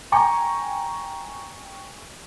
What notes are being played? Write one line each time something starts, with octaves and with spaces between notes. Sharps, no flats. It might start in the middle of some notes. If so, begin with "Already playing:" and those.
G5 G#5 A#5 C#6